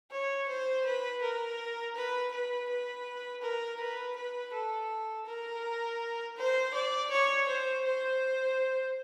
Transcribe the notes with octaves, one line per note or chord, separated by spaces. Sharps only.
C#5
C5
B4
A#4
B4
B4
B4
A#4
B4
B4
A4
A#4
C5
D5
C#5
C5
C5